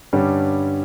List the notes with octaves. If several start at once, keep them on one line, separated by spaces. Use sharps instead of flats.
G2 D3 G3 C#4